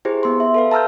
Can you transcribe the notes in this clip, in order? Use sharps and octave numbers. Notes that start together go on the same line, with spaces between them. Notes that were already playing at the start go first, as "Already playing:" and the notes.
E4 G4 G#4 C5
B3 C6
E5
A4 B4 F5
A5 A#5 E6 F6 G6